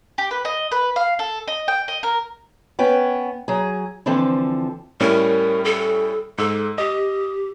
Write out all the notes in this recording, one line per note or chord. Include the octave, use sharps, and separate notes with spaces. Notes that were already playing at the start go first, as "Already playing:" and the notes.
G4
B4
D#5
B4
F5
A4
D#5
G5
D#5
A#4
B3 C#4 G5
F#3 G#4
D3 E3 F3 C4 A4
A2 G3 C#4 A#4
A4
G#2 A4 E6
G4 D#5